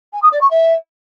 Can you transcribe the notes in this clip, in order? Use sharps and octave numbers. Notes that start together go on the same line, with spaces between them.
G#5
D#6
D5
C#6
E5